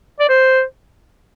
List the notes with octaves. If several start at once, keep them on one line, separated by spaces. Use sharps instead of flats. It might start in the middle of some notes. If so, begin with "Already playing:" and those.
D5
C5